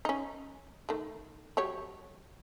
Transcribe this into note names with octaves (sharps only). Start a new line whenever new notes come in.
C#4 D#4
D#3 A3
F#3 G4 C#5